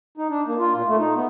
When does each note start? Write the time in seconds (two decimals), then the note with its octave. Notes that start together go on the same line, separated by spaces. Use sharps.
0.18 D#4
0.30 D4
0.46 A#3
0.58 F4
0.74 A#2
0.87 A3
0.99 D#4
1.15 B3